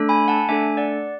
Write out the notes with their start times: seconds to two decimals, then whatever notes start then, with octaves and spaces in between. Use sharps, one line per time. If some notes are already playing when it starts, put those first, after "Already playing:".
Already playing: A3 D4 A4
0.09 G#5 B5
0.28 F#5 A5
0.49 A3 D4 A4 E5 G#5
0.77 D5 F#5